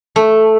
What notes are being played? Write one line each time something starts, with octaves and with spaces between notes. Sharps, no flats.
A3